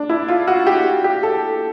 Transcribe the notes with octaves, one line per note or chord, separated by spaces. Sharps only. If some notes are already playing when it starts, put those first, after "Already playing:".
Already playing: D4
E4
F4
F#4
G4
G4
A4